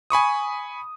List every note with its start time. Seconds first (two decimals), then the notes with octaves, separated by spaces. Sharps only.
0.10 G#5 B5 C#6 D#6